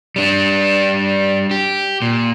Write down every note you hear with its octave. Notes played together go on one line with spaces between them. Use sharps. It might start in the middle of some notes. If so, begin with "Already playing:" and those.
G3 D4
G4
A#2